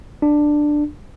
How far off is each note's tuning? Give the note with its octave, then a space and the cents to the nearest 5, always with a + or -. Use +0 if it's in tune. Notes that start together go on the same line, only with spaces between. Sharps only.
D4 +10